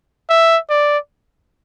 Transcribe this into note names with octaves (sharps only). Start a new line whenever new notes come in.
E5
D5